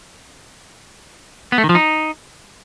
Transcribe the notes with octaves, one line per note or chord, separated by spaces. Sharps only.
B3
A3
D#3
F3
D#4